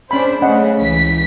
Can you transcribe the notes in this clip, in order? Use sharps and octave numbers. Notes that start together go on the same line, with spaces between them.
C#4 D4 G#4 C5 B5
C#3 A3 C#4 D#5 F#5
C#2 E3 B6